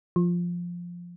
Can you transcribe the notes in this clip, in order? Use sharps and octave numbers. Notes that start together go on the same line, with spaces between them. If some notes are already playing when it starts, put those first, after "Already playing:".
F3